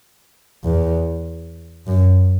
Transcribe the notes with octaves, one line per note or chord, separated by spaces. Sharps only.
E2
F#2